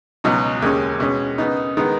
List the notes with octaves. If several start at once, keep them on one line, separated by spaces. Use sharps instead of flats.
C#2 B2 F#3 D#4
D#2 C#3 G#3 C#4
B2 G#3 C#4
C#3 B3 D#4
D#3 G#3 B3 D#4